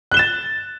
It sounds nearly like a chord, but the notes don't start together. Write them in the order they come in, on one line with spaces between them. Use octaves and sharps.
F#6 G7 E7 A6